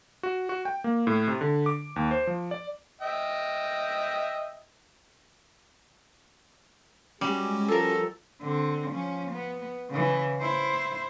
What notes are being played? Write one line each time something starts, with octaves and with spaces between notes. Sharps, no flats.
F#4
F#4
G5
A#3
A2
C3
D3
D6
D#2
C5
F3
D5
D#5 E5 G5
G3 G#3 C#4 F#4
F3 A4 A#4
D3 C4
F3 C#4
B3
C#3 E3
E4 C5